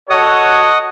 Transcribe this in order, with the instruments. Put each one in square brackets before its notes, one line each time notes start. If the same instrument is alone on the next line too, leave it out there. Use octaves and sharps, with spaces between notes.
[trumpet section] F#4 A4 C#5 [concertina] D#5 F#5 D#6